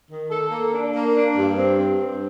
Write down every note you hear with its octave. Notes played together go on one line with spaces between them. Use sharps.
D#3
A4
A#3
D4
A#3
D4
G2
C4
C4
G2